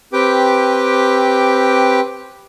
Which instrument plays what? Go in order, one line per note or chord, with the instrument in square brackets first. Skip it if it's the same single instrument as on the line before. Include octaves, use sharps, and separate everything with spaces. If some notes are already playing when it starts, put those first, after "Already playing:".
[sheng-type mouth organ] C4 G4 B4 G5 D6